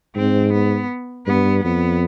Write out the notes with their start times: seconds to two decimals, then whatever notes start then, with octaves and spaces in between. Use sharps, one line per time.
0.15 G#2 C4
0.53 B3
1.27 G2 B3
1.64 F2 B3